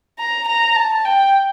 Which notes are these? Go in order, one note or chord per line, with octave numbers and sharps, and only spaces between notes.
A#5
A#5
A5
G5